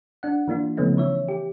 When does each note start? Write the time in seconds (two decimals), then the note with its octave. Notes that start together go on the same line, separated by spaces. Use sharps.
0.23 D4 F#5
0.48 E3 A#3 D4 F4
0.77 C#3 F3 A3 B3 C#4 D#4
0.97 E3 C#5 E5
1.28 G4